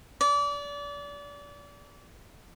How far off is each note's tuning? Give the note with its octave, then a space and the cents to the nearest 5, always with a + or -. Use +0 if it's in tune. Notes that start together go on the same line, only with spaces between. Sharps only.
D5 -30